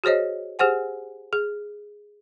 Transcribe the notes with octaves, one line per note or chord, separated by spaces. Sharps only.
F#4 G#4 C5 C#5 D#5
G4 G#4 C5 F#5 G#5
G#4